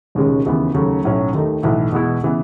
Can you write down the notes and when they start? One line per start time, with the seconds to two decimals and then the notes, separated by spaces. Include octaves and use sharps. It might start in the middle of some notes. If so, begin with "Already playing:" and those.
0.15 E1 D#2 C#3 G#3 C#4
0.46 D#2 C#3 E3 B3
0.74 D#2 C#3 F#3 A3
1.04 B1 A2 F#3 C#4
1.33 D#2 D#3 A3 D#4
1.63 B1 A2 E3 A3
1.92 E2 B2 G#3 B3 E4
2.23 C#3 E3 B3